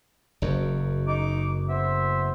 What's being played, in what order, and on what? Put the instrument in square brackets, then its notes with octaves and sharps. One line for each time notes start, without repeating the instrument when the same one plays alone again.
[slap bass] F#1 F#2
[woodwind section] D#4 D6
B3 C5 E5